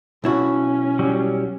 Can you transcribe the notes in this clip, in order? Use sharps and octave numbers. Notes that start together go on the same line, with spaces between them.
B1 C#4 E4 F#4
F#3 G3